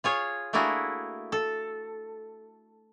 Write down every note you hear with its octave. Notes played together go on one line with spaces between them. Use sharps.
F4 G#4 C#5
A3 A#3 D4 E4 F#4 G#4
A4